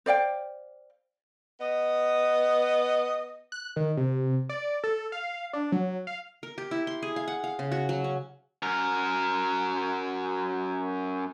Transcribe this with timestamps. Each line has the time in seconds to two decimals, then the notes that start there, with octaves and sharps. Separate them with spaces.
0.06 C5 D5 F5 G5
1.59 B3 D#5
3.52 F#6
3.76 D#3
3.97 C3
4.49 D5
4.84 A4
5.12 F5
5.53 D4
5.72 F#3
6.07 F5
6.43 A#4
6.58 G4
6.71 E4
6.87 C6
7.03 G#4
7.16 F5
7.28 F#5
7.44 F5
7.59 C#3
7.72 F#4
7.89 F#3
8.04 C#4
8.63 F#2 A#4